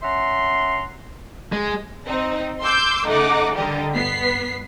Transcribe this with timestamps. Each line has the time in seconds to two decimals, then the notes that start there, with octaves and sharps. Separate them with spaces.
0.03 C#4 E5 F#5 A#5 C6
1.52 G#3
2.06 C4 D#4
2.61 C6 D6 E6 G6
3.06 C#3 A3 D#4 F#5 D6
3.56 D3 G3 G4 A#4 D#5
3.92 G2 B3 B6 C7